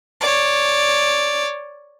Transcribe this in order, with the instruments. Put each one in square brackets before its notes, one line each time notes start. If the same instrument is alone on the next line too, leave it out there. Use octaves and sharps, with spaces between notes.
[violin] C#5 D5